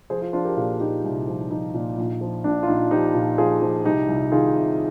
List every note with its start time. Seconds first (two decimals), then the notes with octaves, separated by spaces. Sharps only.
0.10 F3 G#4 C5
0.22 F4 G#4
0.33 F3 D4 F4
0.45 G4 A#4
0.57 A#2 F4 G#4
0.80 A#2 D#4 G4
1.04 C2
1.28 F3
1.39 F4
1.50 F3 D#4
1.74 A#2
1.98 A#1
2.21 F3
2.44 A#1 D4
2.63 F4
2.68 A#1 D#4
2.91 F3 D#4 G4
3.15 A#2
3.38 F3 F4 G#4
3.62 F3
3.85 C2 D#4 G4
4.08 C2
4.32 D#3 F4 G#4
4.55 C3